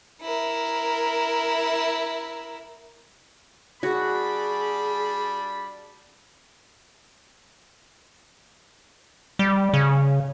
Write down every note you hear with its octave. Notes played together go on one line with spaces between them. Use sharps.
E4 A#4
G3 D4 F#4 G#4 B5
G3
C#3